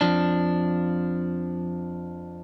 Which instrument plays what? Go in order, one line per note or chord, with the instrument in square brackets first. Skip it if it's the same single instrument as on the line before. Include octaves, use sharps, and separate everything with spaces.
[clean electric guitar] F2 F3 D4